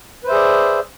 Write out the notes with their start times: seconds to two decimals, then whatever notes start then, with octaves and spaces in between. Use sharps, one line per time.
0.24 B4
0.27 C5
0.29 E5
0.32 G#4
0.35 D5